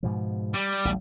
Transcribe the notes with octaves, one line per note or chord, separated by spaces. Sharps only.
G#2 B2 F3
G3
A1 D2